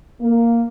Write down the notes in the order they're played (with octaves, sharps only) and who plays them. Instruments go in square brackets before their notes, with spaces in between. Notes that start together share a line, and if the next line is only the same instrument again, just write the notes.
[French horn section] A#3